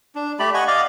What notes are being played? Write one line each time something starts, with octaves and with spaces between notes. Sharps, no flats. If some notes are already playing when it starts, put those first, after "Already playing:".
D4
A3 G4 D5 B5
D#5 F#5 G#5 C#6
D5 D#5 F5